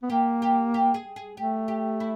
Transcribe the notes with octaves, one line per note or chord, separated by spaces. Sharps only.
B3
A#3 G4
G4
G4
G#4
G#4
A3 G4
G4
E4